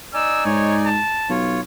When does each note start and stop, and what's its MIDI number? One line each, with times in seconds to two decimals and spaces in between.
0.14 0.89 63
0.14 0.89 74
0.14 0.89 80
0.14 0.45 88
0.46 0.99 44
0.46 0.76 73
0.86 1.34 81
1.30 1.59 35
1.30 1.61 65
1.30 1.61 73